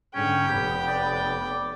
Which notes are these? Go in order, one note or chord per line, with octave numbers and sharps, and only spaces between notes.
G#2 D3 C#4 G5
F1 B3 G4
D5